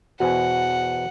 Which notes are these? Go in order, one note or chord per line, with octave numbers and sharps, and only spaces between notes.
E2 B2 F#4 C5 F#5 G#5